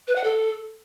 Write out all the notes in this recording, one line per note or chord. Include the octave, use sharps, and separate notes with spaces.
B4
F#5
A4